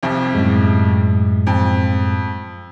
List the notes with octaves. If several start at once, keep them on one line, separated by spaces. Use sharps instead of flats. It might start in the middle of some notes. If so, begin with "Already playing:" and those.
C2 F2
F#2 A2 G#3
F2